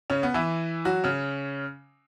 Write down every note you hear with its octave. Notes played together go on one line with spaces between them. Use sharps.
C#3 C#4
B3
E3 E4
F#3 F#4
C#3 C#4